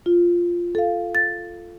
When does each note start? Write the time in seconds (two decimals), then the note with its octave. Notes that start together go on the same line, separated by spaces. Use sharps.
0.06 F4
0.75 A4 F5
1.15 A6